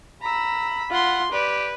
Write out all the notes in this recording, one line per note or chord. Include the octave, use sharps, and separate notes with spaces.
A#5 B5 E6
F4 F#5 C6
G4 B4 D5